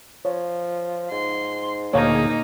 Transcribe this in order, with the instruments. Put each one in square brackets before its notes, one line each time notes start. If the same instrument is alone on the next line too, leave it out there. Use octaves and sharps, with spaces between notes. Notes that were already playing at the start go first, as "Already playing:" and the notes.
[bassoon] F3 [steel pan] C#5
[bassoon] G#2 [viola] C6
[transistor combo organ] D2 A#2 G#4 [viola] A#3 D#4 [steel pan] C#5 F5 G5